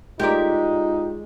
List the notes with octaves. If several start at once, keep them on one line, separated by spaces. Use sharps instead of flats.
G#3 D#4 F4 G4 A#4 D5 E5